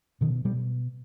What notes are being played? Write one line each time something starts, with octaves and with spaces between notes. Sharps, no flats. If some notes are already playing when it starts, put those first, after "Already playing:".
B2 D#3
B2 G3